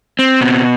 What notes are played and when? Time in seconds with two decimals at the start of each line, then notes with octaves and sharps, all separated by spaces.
0.19 C4
0.41 B2